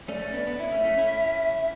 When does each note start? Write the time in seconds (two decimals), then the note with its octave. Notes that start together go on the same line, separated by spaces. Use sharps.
0.08 A3 C#4 D5
0.21 A3 C#4
0.33 B3 D4
0.47 B3 D4
0.59 C#4 E4 E5
0.71 A3 C#4
0.84 A3 C#4
0.97 C#4 E4